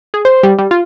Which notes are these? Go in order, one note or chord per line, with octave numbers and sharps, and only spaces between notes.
G#4
C5
G3
G3
F4